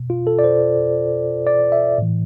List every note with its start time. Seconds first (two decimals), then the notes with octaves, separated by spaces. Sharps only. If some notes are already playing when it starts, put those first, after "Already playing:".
Already playing: B2
0.10 F4
0.27 A4
0.39 D5
0.44 C5
1.47 D5
1.72 E5
1.98 A2 E3